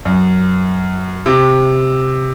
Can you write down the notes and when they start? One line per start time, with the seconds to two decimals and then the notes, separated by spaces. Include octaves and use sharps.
0.05 F#2
1.26 C3